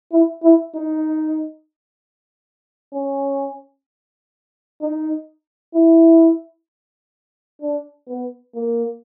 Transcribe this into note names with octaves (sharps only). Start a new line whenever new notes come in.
E4
E4
D#4
C#4
D#4
E4
D4
B3
A#3